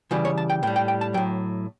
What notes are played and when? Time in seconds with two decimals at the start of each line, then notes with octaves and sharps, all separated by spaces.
0.11 C#3 E3 G3 F#4
0.25 C#5
0.38 A5
0.50 G5
0.63 A2 G5
0.67 G3
0.76 G5
0.88 G5
1.01 A5
1.14 A2 F#3 G5